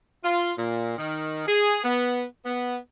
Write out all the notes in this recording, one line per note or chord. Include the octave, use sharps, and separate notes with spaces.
F4
A#2
D#3
G#4
B3
B3